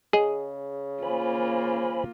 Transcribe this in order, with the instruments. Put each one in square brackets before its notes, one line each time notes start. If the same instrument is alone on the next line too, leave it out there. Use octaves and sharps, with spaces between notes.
[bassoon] C#3 [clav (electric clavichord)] G#4 D#5
[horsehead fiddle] A#3 F4 [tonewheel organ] C5 G#5 B5